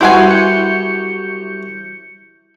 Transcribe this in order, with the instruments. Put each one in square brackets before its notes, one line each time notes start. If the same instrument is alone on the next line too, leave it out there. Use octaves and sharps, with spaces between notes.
[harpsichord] C2 F#3 [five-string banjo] E4 B4 G#5 [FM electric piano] F#5 C6 G6
[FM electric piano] G6 C#7